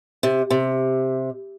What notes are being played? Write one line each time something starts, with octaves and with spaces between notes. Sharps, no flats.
C3
C3